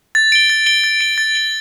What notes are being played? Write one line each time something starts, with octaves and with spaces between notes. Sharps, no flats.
A6
D7 G7
A6
D7 G7
A6
D7 G7
A6
D7 G7